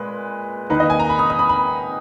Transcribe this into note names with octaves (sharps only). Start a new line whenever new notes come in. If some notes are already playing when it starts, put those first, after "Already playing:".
Already playing: A#2 G#3 B4
D#3 A#3 D#4 B4
D#5
G#5
A#5
B5
D#6
D#6
B5
B5